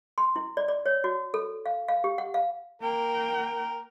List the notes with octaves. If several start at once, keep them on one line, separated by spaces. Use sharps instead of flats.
C6
E4
D5
D5
C#5
F#4
A4
F5
F5
G4
F#5
F5
A#3 A#4 G5